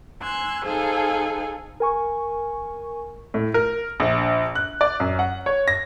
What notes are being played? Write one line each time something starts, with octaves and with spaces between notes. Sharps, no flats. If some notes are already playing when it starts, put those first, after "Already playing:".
G#5 C6 E6 F#6 G#6
D#4 G#4 A4 C5 F5 G#5
A#4 G#5 C#6
A2
A#4
A#1
F#6
D5
F#2
F#5
C#5
A#6